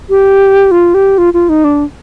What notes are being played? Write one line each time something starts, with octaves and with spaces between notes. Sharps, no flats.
G4
F4
G4
F4
F4
D#4
D4